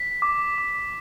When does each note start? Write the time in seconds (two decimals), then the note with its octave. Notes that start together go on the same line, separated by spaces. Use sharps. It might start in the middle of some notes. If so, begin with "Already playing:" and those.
Already playing: B6
0.22 D6
0.58 D6